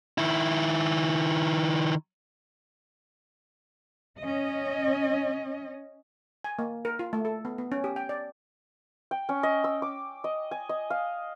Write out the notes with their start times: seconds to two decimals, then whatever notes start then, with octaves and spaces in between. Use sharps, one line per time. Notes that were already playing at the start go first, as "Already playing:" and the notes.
0.18 D#3 E4
4.19 C#4 D#5
6.44 G#5
6.59 A#3
6.85 A#4
6.99 F4
7.13 A3
7.25 A4
7.45 B3
7.58 B3
7.72 C#4
7.84 G4
7.96 G5
8.09 D5
9.11 G5
9.29 C#4
9.43 D#5
9.64 E6
9.82 D6
10.24 D#5
10.51 G#5
10.69 D#5
10.90 F5